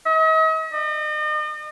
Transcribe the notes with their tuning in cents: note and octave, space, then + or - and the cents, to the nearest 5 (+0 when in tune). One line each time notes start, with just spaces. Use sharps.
D#5 +45
D#5 -40